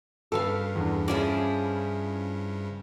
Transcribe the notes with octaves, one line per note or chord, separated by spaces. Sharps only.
G2 C#3 A4 B4 F5
E2 D4
F3 C#4 E4 G#4 D5